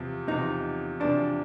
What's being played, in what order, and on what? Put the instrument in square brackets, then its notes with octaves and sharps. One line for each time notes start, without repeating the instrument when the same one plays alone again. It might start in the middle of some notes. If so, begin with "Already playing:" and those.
Already playing: [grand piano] E2 C3 F3
[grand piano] E2 C3 F3 [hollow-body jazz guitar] D#4
[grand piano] E2 C3 F3 [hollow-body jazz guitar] D4